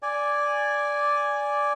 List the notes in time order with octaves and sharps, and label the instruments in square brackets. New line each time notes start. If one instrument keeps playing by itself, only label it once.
[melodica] D5 G#5